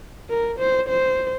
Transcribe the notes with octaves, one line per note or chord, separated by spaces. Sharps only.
A#4
C5
C5